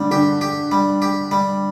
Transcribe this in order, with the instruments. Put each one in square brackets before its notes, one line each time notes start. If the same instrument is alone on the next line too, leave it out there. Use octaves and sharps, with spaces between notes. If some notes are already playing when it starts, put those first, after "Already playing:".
Already playing: [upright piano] D3 [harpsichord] G3
[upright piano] D3 [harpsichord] G4
[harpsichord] G4
G3
G4
G3